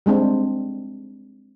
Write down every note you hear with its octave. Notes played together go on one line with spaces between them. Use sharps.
G3 G#3 C4 D4